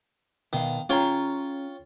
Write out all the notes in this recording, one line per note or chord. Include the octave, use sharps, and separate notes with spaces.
B2 D#3 B3 F5
C#4 F4 G#4 C#5 G5 A#5